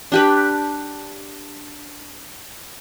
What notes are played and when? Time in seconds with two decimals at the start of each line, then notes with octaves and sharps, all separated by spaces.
0.12 D4 G4 B4